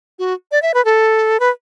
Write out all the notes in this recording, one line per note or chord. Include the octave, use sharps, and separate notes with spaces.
F#4
D5
E5
B4
A4
B4